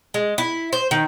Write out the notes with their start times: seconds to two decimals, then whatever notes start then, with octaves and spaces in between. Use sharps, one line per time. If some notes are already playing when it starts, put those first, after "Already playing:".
0.14 G#3
0.38 E4
0.73 C5
0.91 D#3